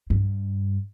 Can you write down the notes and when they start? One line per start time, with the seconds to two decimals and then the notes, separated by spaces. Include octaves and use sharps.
0.10 G2